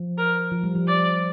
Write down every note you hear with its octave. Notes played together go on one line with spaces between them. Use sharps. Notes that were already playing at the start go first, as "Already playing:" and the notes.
Already playing: F3
A#4
F3
G3
F3
D5